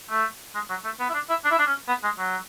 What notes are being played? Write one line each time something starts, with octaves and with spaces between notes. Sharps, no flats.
A3
G#3
F#3
A3
B3
E4
D4
E4
D4
E4
D4
C#4
B3
G#3
F#3